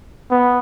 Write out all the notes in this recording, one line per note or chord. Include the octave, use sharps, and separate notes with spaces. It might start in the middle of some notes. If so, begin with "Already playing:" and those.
B3